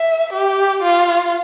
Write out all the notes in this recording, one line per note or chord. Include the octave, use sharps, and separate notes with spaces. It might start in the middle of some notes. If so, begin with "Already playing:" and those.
Already playing: E5
G4
F4